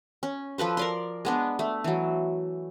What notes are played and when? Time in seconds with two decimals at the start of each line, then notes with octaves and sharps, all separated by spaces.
0.23 C#4
0.58 F3 A4 B4 C5
0.77 A#4 D5 C6
1.25 G#3 B3 D4
1.59 A3
1.84 E3 F#3